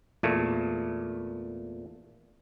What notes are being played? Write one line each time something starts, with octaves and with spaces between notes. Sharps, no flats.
E2 A#2 A3